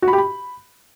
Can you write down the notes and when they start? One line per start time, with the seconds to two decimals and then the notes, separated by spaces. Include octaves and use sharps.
0.02 F#4
0.08 B5
0.13 G4
0.18 B5